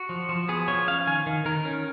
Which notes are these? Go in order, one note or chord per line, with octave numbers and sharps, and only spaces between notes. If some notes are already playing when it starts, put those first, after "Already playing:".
Already playing: F#4
F3
F3
B3 G#4
F3 C#5
C#4 F5
D#3 G#5
D#3
D#3 A#4
C#4